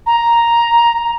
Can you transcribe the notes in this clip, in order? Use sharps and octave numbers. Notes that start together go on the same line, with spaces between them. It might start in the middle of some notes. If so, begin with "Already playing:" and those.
A#5